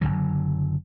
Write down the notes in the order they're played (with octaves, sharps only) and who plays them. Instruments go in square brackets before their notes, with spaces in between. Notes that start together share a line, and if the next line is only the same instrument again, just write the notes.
[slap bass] F#1 C2 D3 F#3